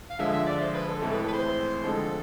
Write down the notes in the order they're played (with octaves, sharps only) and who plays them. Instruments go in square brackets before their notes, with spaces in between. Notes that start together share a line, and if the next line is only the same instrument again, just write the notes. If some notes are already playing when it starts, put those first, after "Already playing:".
[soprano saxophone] F5
[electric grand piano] D3 F3 G#3 [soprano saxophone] E5
[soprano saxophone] E5
D5
C5
B4
A4
[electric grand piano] A2 E3 G#3 C4 E4 [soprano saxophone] A4
[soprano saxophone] B4
A4
B4
C5
[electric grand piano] D3 F3 G#3 C4 [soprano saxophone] A4